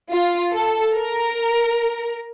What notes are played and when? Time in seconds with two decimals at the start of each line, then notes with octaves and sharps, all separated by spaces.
0.13 F4
0.55 A4
0.97 A#4